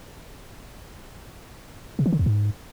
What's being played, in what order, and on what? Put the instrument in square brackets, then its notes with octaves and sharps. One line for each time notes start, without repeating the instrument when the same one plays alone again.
[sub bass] C3
E3
D3
E2
G#2